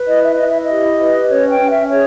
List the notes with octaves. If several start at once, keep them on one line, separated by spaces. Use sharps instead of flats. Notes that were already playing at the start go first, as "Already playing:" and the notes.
Already playing: B4
E4 D#5
E5
E4 D#5
E5
D#5
G4
B4
C#4 C#5
G5
C#4
E5
G#4 C#5